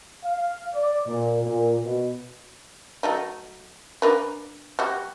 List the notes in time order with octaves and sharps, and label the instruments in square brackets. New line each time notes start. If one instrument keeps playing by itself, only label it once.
[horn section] F5
D5
A#2
A#2
B2
[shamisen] F#3 A3 D#4
D4 A#4 B4
G3 F#4